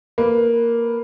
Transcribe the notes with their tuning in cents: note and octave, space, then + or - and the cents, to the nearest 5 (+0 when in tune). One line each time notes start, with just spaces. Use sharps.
A#3 +0 B4 -5